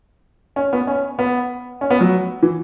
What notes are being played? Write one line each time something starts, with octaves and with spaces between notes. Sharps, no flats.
C#4
B3
C#4
B3
C#4
B3
F#3
E3